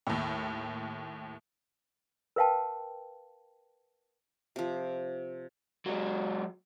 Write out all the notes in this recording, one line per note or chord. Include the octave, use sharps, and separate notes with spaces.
D#2 A2
A#4 B4 F5 G5 A5
C3 F3
F#3 G#3